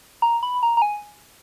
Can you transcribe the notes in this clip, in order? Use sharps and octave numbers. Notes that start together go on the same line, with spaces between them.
A#5
B5
A#5
A#5
G#5